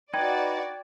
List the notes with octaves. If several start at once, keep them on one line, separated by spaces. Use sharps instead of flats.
D#4 F#4 B4 D5 G5 G#6